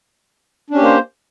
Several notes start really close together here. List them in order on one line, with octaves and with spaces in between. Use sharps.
D4 C#4 G4 A#3 C5